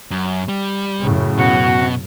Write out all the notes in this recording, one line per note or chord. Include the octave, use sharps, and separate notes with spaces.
F#2
G3
F#2 A2 C#3
B2 F#4 F#5